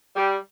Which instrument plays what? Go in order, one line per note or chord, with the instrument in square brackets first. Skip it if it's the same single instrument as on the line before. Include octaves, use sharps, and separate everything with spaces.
[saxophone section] G3